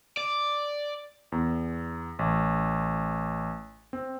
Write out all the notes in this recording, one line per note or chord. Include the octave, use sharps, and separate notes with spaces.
D5
E2
A1
C4